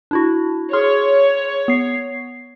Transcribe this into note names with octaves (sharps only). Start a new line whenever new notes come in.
D4 E4 F#4
G#4 C#5 C6 F6
B3 C7